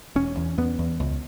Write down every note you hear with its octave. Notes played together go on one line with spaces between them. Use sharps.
E1 C#4
E2
E2 B3
E2
C#2